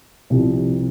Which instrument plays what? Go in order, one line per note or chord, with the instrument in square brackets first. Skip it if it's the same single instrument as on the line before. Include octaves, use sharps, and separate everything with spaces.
[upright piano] C2 C3 F3